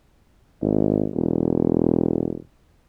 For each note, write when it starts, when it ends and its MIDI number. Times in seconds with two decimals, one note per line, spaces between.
0.62 1.08 32
1.15 2.37 28